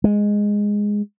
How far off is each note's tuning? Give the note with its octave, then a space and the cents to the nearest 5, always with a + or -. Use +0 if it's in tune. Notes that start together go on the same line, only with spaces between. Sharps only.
G#3 -5